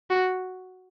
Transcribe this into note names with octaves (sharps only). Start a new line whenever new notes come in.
F#4